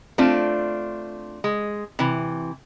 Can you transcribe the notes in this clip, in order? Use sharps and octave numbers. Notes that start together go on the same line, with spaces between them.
A3 C4 D4 F4
G#3
C3 E3